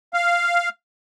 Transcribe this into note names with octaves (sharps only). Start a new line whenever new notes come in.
F5